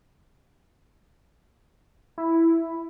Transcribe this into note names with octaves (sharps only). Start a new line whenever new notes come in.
E4